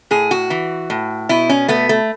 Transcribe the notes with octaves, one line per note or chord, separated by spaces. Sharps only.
A2 G#4
F#4
E3
A2
B2 E4
C#4
A3 B3
A3